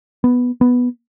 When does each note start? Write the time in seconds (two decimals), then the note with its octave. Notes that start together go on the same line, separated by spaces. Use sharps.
0.24 B3
0.61 B3